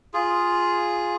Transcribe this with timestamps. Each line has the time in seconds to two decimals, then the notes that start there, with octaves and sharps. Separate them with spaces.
0.14 F4 G#4